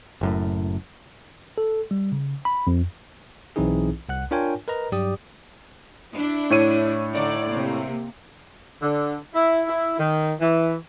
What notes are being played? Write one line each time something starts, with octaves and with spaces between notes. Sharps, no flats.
F#1 F#2 A2
A4
G3
C#3
B5
F2
B1 E3 C4 D#4 E4 G#4
C2 F#5 F#6
D4 F4 A#4 C#5 G5 G#5
A#4 B4 D#5 A#5
G2 F#3 G4 D5 D#6
D4 E4
A2 C#5 D#7
D3 D#4 D5
C3 A#3
D3
E4
E4
D#3
E3